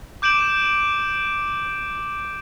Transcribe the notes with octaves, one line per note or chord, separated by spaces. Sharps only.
D6 G6 D7 E7 F#7